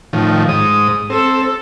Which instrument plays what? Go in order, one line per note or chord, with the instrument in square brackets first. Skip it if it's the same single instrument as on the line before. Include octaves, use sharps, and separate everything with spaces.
[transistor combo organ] A2 D#3 F3
G#2 D#6
[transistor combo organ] C4 [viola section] A4